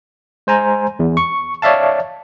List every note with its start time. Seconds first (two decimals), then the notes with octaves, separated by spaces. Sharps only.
0.47 G#3 C5 G#5 A#5
0.99 E2
1.17 C#6
1.62 C#5 D5 E5 F5 A5